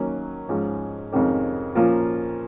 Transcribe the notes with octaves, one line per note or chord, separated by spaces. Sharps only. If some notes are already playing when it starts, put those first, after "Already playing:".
Already playing: D#2 D#3 F#3 A#3 C#4
G#2 F3 G#3 C#4
F2 C3 D#3 G#3 C#4
A#2 F3 A#3 C#4 F4